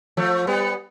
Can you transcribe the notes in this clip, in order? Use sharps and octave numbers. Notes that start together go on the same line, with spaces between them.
F3 A3
G3 B3